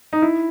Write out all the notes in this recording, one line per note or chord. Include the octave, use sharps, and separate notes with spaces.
D#4
E4